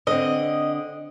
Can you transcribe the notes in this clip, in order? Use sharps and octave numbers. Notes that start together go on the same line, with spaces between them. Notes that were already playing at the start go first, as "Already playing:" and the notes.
D3 C4 D#5